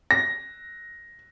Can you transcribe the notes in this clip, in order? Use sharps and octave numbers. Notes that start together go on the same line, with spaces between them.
A#6